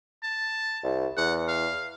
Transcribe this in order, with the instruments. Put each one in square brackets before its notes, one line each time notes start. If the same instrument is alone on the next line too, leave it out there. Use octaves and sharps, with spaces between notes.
[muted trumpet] A5
[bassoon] C2
[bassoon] E2 [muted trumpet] F#5
[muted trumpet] F5